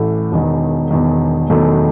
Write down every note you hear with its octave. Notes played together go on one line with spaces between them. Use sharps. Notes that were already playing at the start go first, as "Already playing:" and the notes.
Already playing: A1 A2 E3 A3
E1 E2 D#3
E1 E2 D#3
E1 E2 D#3 F#3 A3